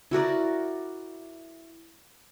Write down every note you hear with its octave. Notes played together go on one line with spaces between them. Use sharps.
E4 F#4 A#4 D5